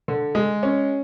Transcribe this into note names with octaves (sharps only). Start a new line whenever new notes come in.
D3
G#3
C#4